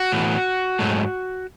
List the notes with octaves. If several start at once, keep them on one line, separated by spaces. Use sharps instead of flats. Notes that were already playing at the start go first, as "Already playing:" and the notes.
Already playing: F#4
A2 E3 B3
G#2 F#3 A3